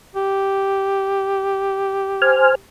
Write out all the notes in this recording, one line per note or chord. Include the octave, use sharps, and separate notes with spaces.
G4
C5 G#5 F6